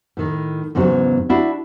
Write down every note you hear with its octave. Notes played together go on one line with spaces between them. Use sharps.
A2 D#3
E2 G#2 C#3 F#3
D4 E4 F#4